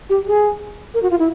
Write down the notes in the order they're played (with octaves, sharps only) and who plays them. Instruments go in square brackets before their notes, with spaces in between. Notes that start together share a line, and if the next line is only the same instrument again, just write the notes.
[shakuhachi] G4
G#4
A#4
F#4
F4
E4